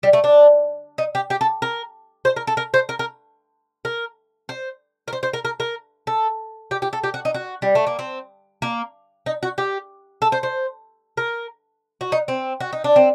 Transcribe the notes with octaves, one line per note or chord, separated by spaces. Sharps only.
G3
A3
D4
D#4
G4
G4
A4
A#4
C5
A#4
A4
A#4
C5
A#4
A#4
A#4
C5
A#4
C5
C5
A#4
A#4
A#4
A4
G4
G4
A4
G4
F#4
D#4
F#4
G3
A3
A#3
C4
A#3
D#4
F#4
G4
A4
C5
C5
A#4
F#4
D#4
C4
F#4
D#4
D4
C4